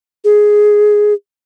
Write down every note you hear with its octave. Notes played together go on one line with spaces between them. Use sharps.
G#4